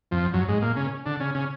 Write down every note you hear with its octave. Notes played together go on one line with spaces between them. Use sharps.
F2 F3
F#2 F#3
G#2 G#3
A#2 A#3
C#3 C#4
D3 D4
C#3 C#4
C#3 C#4